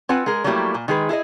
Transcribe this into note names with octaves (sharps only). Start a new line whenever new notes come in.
C4 F4 B4 F#5 G#5
G#3 G#4 A#4
F#3 G3 A3 A#3 E4 G4
A#2
D#3 G#3 G#4 B4
E4 G#4 A#4 D#5